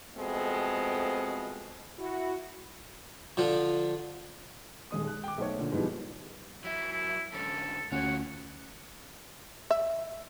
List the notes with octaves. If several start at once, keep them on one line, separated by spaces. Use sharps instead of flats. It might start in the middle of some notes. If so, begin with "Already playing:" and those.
F2 B2 G#3 A3 C4
E4 F#4
D3 F3
D#1 D#2 G#3 D#6
F#6
G5 D6
B1 A3 C5 C#5
A#2 D3
G#2 B2 E3 F3 G3
F#3 E4 E5
E4
G#2 D3 C#4 A4
D2 C#4 F4 F#4 C#5 F#5
E5